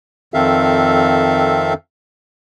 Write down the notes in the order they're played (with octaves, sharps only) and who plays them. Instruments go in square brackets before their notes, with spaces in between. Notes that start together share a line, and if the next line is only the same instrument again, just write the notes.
[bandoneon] F2 D#3 C4 A4 E5 F5